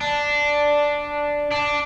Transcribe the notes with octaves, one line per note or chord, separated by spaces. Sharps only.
D4
D4